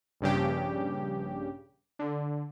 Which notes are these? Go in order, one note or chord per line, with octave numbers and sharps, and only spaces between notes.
A#1 G2 C#3 G4
D3